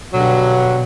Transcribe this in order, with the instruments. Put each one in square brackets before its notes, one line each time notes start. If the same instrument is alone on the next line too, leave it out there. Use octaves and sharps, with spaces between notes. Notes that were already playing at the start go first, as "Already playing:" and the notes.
[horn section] G2 D3 F#3 [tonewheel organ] B2